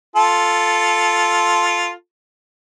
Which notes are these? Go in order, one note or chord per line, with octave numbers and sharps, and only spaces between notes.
F4 A4